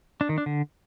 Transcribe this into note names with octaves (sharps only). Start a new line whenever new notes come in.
D4
D#3
D4
D3